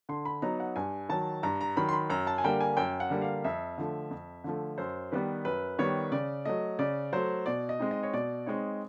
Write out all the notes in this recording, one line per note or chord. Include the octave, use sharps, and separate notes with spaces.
D3 C6
B5
F#3 B3 D#4 A#5
F#5
G2 G#5
D#3 F#3 A5
G2 A#5
A#5
D#3 F#3 B5
C6
B5
F#2 A#5
A5
G#5
D3 G3 A#3 G5
G#5
F#2 G5
F#5
D3 G3 A#3
F5
F2 E5
D3 F3 A3
F2
D3 F3 A3
F#2 C5
D#3 G3 B3 B4
F#2 B4
D#3 G3 B3 C#5
C#3 D5
F#3 A3 D#5
C#3 D5
F#3 A3 C5
B2 D5
D#5
G#3 C4 D#4
D#5
C#5
B2 D5
G#3 C4 D#4 C#5